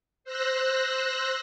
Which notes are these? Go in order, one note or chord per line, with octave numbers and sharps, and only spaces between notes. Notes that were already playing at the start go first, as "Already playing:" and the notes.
C5 E6 F#6 A#6